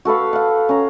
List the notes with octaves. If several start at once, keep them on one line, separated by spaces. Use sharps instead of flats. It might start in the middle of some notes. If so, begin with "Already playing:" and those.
F#4 A4 B4 F5
F5 F#5
C#4 A#5